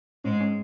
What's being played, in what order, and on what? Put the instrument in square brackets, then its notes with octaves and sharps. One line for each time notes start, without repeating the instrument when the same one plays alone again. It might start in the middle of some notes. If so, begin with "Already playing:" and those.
[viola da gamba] G#2 G#3 [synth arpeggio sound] C#4
[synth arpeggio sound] C#4